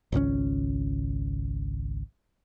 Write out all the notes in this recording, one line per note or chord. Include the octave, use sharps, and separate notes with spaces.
G#1 C#2 C#3 C#4